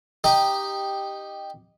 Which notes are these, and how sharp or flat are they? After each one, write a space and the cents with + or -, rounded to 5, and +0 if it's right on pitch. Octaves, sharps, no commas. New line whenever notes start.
D#4 -10 G4 +0